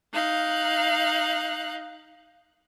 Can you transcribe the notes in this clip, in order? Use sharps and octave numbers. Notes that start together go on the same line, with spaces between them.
D#4 F5 F#6